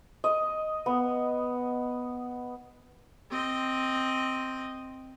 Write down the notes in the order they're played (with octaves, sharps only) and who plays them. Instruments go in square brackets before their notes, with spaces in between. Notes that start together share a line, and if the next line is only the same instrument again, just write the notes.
[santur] D#5
B3
[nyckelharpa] C4 D#5